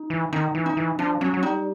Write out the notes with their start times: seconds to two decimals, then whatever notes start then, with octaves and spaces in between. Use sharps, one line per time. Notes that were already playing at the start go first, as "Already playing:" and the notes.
Already playing: D#4
0.10 E3
0.33 D#3 D#4
0.55 E3
0.66 D#4
0.77 E3
0.99 F3 D4
1.21 F#3 C#4
1.34 F#3
1.43 G3 D#4